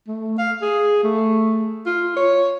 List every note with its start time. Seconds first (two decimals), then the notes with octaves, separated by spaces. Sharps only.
0.08 A3
0.38 F5
0.62 G#4
1.03 A3
1.86 F4
2.16 C#5